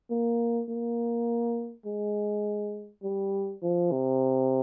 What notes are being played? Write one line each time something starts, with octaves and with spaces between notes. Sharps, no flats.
A#3
A#3
G#3
G3
F3
C3